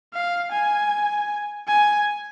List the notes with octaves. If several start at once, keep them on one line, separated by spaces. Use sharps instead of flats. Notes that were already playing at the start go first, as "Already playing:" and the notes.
F5
G#5
G#5